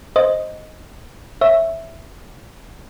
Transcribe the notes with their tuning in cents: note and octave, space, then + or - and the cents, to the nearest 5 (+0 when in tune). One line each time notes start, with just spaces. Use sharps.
C5 +0 D#5 +0
C#5 -15 E5 +0